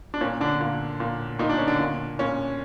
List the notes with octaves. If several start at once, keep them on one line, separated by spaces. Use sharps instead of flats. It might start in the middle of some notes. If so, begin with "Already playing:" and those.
D4
A#2 C#4
D3 D4
A#2
A#2
A#2 D#4
D4
C#4
D3 D4
A#2
A#2 C#4